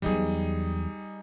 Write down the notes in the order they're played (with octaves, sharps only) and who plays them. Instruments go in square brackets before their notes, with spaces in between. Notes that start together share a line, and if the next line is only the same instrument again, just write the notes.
[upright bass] E2 F#3 [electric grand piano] G3 D#4 G#4